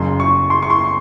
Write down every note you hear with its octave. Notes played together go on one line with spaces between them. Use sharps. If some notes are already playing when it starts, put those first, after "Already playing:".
Already playing: F#1 F#2 C#3 C6
C#6
C6
C#6
C6